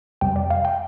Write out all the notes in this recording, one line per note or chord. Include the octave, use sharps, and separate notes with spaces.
F2 C3 G3 G5
D5
F5
G5